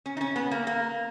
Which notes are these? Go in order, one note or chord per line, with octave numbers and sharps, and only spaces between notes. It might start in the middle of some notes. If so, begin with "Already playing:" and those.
C#4
D#4
C#4
B3
A#3
A#3